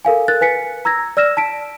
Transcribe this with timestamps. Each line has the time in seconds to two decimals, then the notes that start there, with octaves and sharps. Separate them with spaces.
0.05 A4 A#4 F5 G#5
0.28 A#4 F#6 A6
0.41 B4 G#5 B6 C#7
0.85 A#5 E6 G#6 A#6
1.17 D5 E6 F6 A#6 E7
1.37 A5 B6 D7